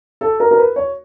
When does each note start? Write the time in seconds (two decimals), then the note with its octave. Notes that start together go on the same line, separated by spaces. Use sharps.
0.21 A4
0.40 A#4
0.51 A#4
0.58 B4
0.76 C#5